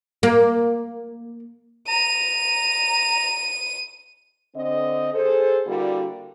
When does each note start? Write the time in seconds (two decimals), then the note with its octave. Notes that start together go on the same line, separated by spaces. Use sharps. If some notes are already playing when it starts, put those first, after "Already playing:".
0.23 A#3
1.88 A#5 D#7
4.56 D3 C4 D#5
5.13 G#4 A4 C5
5.66 D3 G3 A#3 E4 F#4